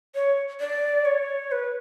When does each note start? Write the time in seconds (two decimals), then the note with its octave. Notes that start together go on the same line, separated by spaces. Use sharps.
0.15 C#5
0.60 D5
1.05 C#5
1.52 B4